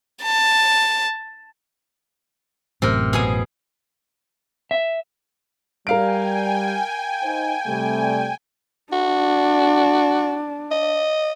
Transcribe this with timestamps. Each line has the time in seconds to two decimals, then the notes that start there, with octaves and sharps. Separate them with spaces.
0.22 A5
2.82 A1 F#2 A2 C3 A#4
3.13 B2 G#4 G#5
4.71 E5
5.87 G3 A#4 F5 G5 G#5 D7
7.24 D#4 C5
7.66 C3 G3 A3
8.93 D4 F#4
10.71 D#5